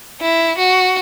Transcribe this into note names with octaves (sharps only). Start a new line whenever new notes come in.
E4
F#4